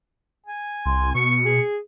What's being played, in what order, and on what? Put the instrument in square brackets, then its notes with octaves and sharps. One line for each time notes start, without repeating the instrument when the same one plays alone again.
[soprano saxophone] G#5
[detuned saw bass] C2 [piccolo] C6
[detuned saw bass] B2 [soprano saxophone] C#6 [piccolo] C#7
[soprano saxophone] G#4